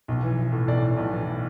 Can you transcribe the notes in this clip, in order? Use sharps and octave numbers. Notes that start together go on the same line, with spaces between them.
B1
E3
E3
A2
B1 D5
A2
B1
E3